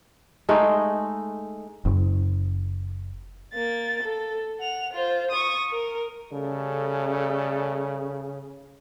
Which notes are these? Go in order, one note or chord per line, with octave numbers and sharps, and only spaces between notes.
G#3 A3 D#4
F#1
A#3 A6
A4
F#5 F7
F4 C5
C#6 D#6
A#4
C#3 G3 A3 A4